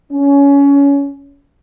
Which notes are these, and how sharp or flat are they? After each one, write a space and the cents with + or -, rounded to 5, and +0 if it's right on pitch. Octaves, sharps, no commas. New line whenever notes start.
C#4 +20